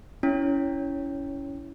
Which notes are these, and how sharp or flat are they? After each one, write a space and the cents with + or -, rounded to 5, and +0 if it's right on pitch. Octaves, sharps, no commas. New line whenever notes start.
C#4 +20 E4 +0 C#5 +0